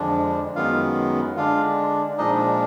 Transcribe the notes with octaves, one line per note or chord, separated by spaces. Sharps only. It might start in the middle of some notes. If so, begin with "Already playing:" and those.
Already playing: F2 D3 F3 G#3 D4
F#2 D#3 G#3 B3 F4 F5
D3 G#3 D4 F4 F5
A#2 F3 G#3 D4 D#4 D#5